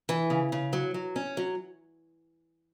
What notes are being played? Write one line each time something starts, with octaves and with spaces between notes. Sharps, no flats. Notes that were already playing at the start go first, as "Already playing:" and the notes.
E3
C#3
C#3
F#3
F#3
C#4
F#3